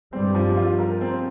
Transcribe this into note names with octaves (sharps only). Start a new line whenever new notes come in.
G2 G3 C4
F3
F4
A#4
C4